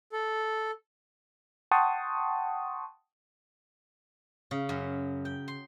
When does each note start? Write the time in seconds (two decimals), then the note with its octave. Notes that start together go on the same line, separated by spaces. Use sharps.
0.12 A4
1.71 F#5 G5 A5 C6 C#6 D#6
4.51 C#3
4.69 F#2
5.25 G5
5.48 C6